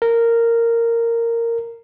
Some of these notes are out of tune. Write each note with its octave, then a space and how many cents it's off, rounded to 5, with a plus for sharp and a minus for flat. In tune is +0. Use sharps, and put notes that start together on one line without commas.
A#4 -10